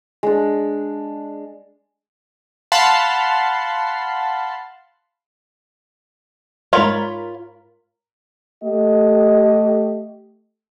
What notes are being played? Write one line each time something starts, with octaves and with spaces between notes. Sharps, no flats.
G#3 D4
F5 F#5 A5 B5 C6
G#2 F4 A#4 C#5 B5
A3 G4 D#5